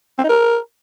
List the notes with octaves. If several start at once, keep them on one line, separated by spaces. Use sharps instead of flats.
C4
D#4
A#4